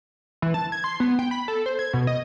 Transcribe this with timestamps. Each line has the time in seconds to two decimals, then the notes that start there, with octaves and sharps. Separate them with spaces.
0.42 E3
0.54 A5
0.72 G#6
0.84 C6
1.00 B3
1.19 G5
1.31 B5
1.48 A4
1.66 C5
1.79 G#6
1.93 B2
2.07 D#5